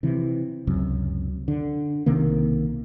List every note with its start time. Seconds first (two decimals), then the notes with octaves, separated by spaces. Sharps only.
0.03 C3 E3
0.67 C#2 F#2 C3
1.48 D3
2.06 B1 C3 D#3 A#3